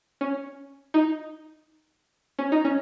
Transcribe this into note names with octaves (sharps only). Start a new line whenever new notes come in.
C#4
D#4
C#4
D#4
C#4